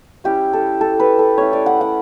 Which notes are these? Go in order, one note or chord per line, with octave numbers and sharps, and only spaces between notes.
G3 C#4 E4 G4
A4
A4
B4
A4
A3 C#4 E4 C#5
D5
F#5
F#5